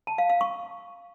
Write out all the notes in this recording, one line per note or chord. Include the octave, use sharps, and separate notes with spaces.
A5
F5
F5
C#6